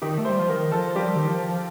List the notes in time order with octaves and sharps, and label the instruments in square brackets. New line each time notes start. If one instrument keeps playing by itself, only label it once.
[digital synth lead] D#3 [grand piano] G4
[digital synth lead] A3
[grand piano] C5
[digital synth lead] G3
F3
[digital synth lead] D#3 [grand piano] A#4
[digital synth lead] F3 [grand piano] A4
[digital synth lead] G3 [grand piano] G4
[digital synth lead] D#3
F3